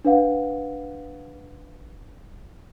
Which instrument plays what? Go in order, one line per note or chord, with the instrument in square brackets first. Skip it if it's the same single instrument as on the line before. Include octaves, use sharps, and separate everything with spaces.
[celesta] D4 B4 F5 F#5